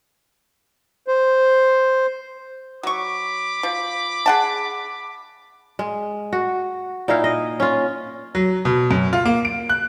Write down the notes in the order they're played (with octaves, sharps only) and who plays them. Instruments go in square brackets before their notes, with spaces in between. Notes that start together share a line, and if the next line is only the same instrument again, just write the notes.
[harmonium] C5
[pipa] F#3 C#6 [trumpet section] B5 D6
[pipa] F3
G#4 F#5 A5
[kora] G#3
F#4
A#2 D#4 E4 F5
D#5
C#4 F4
[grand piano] F#3
B2
F#2
F4
A#3
D7
F#6